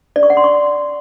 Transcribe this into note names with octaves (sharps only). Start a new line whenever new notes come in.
D5
C#6
F#5
C6
C#6